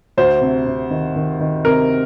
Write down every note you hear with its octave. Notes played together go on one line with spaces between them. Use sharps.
D2 C5
C3
C3
D#3
D#3
D#3
C3 A#4